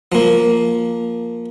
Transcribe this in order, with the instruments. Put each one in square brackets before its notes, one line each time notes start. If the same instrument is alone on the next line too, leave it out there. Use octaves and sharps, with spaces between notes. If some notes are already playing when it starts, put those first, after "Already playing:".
[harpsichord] F3 A#3